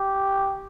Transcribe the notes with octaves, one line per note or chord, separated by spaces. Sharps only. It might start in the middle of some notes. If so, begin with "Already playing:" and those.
Already playing: G4